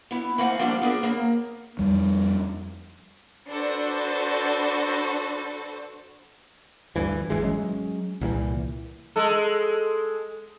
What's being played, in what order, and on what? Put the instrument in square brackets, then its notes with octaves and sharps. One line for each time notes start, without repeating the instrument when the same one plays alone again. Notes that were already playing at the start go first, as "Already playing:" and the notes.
[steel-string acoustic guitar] B3 E4
A3 A#3 C4 E4 F#5 G#5
F3 G3 A#3 B3 C#4 D4
B3 D4 G#4 A#4
C#3 A#3
[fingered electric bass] F2 G3
[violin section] D4 F#4 A4 B4 C5
[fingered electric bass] D2 G2 E3
G#1 E3 G#3
F#3 G#3 C#4
C2 A#2 E3
[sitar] G#3 A4